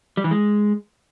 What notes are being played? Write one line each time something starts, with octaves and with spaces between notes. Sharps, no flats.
G3
E3
G#3